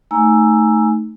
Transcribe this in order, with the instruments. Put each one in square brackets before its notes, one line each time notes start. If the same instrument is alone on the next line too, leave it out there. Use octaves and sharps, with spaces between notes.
[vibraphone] A3 D#4 G#5 A#5 E6